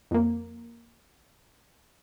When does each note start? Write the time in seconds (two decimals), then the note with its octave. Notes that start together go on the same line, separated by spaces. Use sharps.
0.11 F2 A#3